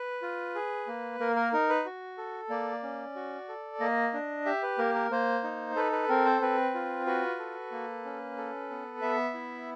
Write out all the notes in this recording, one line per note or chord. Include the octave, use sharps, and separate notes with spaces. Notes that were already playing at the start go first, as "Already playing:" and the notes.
Already playing: B4
F4
G#4
A#3
A#3 A#4
A#4
D#4 A#4
B4
F#4
A4
A#3 D5
C#4
F#4
A4
A#3 D#5
D4
G4 E5
B4
A#3 A#4
A#4
A#3 C5
D#4
A4 B4
B4
C4 A#4
C5
C4 B4
F4
F#4 B4
A4
A#3
C#4
A4
B3
B3 E5
E4